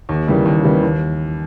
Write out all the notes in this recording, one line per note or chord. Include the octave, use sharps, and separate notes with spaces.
D#2
C#3 E3 G3 A#3
D#2
C#3 E3 G3 A#3
D#2